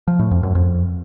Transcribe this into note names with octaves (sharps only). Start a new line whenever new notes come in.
F3
A2
F2
F#2
F2